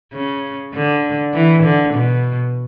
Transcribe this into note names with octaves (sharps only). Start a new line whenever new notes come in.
C#3
D3
E3
D3
B2